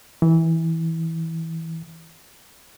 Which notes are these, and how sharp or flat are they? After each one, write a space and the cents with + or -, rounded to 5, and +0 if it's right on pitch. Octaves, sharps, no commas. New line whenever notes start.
E3 -15